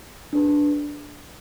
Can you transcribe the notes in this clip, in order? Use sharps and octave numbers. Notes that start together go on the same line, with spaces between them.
D4 G#4 B4